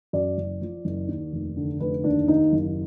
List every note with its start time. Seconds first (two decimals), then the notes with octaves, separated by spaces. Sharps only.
0.13 F#2 D5
0.37 F#1
0.61 F3
0.85 F#1
1.08 D#2
1.32 F1
1.57 D3
1.80 F1 B4
2.04 D#2 D4
2.28 D#2 D#4
2.52 F#1